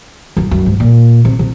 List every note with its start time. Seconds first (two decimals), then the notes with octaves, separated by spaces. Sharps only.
0.37 F#2
0.51 F#2
0.66 G#2
0.80 A#2
1.25 C3
1.39 C3